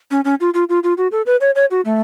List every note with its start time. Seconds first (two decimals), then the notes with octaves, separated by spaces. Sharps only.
0.11 C#4
0.25 C#4
0.40 F4
0.54 F4
0.69 F4
0.83 F4
0.98 F#4
1.12 A4
1.26 B4
1.41 C#5
1.55 C#5
1.71 F#4
1.85 A3